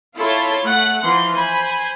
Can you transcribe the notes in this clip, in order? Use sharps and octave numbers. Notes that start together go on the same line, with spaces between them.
E4 F4 A4 C#5 A5 C6
A3 F#5
E3 F3 C6
C5 G#5 B5